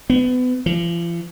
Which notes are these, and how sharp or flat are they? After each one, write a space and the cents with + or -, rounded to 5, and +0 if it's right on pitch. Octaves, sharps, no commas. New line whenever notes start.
B3 +30
F3 -45